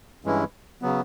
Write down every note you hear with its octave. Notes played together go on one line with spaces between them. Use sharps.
G2 E3 G#3 C#4 E4
C#3 F#3 B3